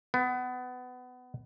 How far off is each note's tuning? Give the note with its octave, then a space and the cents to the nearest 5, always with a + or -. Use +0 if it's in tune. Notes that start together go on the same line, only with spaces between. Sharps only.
B3 +25